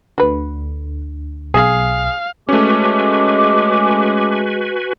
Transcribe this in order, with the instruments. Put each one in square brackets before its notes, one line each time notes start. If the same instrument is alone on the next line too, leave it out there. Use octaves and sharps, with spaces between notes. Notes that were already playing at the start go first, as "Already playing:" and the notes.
[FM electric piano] D2 D3 [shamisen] F#4 B4
[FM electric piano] B1 [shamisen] G#3 [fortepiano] G#4 [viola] F5
[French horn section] G#3 [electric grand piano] A3 C#4 [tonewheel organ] F#4 B4 G#5 [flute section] D6